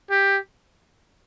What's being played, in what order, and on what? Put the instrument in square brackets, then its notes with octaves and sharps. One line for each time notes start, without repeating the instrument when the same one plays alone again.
[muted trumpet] G4